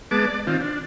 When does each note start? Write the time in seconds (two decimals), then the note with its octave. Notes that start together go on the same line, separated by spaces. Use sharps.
0.11 G#3 B3 A5 D6
0.27 D5
0.47 D#3 C4 F4
0.61 D4